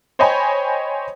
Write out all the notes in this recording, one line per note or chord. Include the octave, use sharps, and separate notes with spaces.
C5 C#5 D#5 G5 G#5 B5